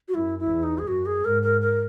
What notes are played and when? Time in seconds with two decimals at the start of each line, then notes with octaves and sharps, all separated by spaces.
0.08 F#4
0.14 F#2 E4
0.39 E4
0.51 E2
0.63 D#4
0.78 G#4
0.87 F#2 F#4
1.06 G#4
1.25 G#2 A#4
1.42 A#4
1.61 A#4